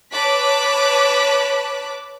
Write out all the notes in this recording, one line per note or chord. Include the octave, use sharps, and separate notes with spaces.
B4 C#5 A5 D6 F#6 B6